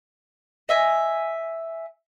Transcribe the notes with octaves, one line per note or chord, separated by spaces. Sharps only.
D#5 E5 G#5